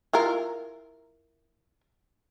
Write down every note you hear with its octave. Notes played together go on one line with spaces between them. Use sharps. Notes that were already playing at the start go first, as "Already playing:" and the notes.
E4 F4 A#4